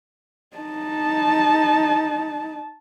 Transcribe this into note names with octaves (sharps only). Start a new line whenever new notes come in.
D#4 A5